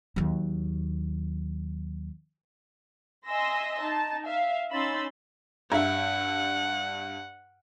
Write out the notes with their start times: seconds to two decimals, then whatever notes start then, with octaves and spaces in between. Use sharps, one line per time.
0.16 D#2 F#3
3.26 D#5 E5 G#5 C6 E6 A#6
3.80 D#4 A5
4.26 E5 F5
4.71 C#4 D#4 B5 C6 E6 A6
5.72 G2 E5 F#5